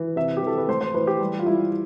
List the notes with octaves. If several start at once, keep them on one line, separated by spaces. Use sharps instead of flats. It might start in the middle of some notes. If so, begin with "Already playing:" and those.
Already playing: E3
C3 E5
G4
E3 A4
B4
A2 C5
C5
E3 B4
G4
G3
F4
G3 E4